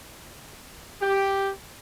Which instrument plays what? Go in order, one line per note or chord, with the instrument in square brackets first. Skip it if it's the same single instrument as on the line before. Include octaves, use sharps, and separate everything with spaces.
[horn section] G4